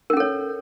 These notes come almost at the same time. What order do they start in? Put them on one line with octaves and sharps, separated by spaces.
A#4 C#4 A4 C#5